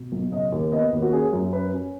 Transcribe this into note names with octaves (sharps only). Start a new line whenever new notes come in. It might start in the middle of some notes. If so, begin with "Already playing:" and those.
Already playing: B2
B1
C#3 D#5
D#2
B3 D#5
D#2
F#4
C#4 G#4
F#2
C#4 B4
C#4